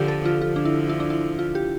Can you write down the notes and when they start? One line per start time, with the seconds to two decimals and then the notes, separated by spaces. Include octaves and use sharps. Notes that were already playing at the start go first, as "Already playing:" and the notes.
Already playing: D3 F3 G4
0.08 A4
0.25 F4
0.41 D3 F3 F4
0.56 D4
0.65 E4
0.89 E4
1.00 D4
1.10 E4
1.39 F4
1.55 G4